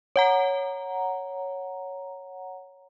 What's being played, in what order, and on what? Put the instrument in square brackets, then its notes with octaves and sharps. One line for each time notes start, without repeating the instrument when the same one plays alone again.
[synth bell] C#5 F#5 A#5